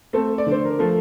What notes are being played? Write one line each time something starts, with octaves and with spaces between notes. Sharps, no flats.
A3 C4 A4
D5
D3 C5
A#4
F3 A3 A4